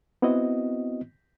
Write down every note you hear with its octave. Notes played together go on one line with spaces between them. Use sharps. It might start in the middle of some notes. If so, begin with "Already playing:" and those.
B3 C4 E4 F#4 D#5